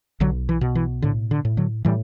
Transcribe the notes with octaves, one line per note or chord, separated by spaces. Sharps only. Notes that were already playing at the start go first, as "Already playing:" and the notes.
B1 D3 F#3
E3
B2
E3
A2 D3
D3
A2
D3 F#3
A2 E3 G3